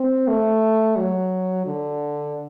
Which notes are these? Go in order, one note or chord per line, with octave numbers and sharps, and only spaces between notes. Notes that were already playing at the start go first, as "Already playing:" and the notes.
Already playing: C4
A3
F#3
D3